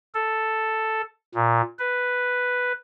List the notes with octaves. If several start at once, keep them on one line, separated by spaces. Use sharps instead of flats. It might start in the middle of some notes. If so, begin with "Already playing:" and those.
A4
A#2
B4